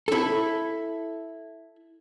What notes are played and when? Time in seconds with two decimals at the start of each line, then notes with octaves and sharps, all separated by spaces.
0.08 E4 A4